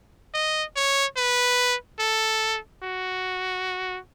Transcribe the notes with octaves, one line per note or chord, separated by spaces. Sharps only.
D#5
C#5
B4
A4
F#4